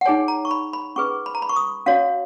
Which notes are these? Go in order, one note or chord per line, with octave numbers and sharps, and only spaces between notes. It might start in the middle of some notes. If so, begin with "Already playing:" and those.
F#5
D#4 G#4 C#5 G#5
A#5
C#6
B5
B5
C#4 G#4 B4 C#6
B5
A#5
B5
C#6
D#6
C#4 F#4 C#5 F5